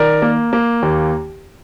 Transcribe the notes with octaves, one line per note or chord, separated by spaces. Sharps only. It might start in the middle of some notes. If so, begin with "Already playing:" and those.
Already playing: D#3 A#4 D5
A#3
A#3
D#2